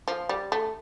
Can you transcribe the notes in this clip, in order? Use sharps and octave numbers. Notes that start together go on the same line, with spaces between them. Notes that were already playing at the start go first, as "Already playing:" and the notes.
F3
G3
A3